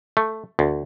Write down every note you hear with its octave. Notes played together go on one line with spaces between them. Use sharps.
A3
D2